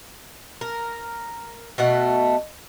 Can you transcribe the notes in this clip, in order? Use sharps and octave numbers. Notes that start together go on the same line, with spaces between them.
A#4
B2 A3 F#5